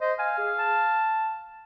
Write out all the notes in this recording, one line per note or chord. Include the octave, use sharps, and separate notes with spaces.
C5 D#5
F5 G#5
G#4
A5